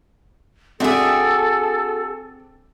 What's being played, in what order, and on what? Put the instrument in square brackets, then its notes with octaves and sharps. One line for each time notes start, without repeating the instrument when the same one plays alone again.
[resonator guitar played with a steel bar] C4 D4 E5 [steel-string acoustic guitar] F#4 G#4 [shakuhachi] A4